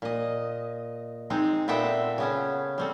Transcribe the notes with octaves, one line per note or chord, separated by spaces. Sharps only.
A#2 D#5
G#3 C4 D#4
A#2 B3 C4 A4 E5 G5
C#3 B3 C#4
G3 C4 A4